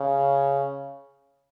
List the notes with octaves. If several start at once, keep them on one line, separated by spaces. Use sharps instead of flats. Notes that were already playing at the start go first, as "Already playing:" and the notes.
Already playing: C#3